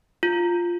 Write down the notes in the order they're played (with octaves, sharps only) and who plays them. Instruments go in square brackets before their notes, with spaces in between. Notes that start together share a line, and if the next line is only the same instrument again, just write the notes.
[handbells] F4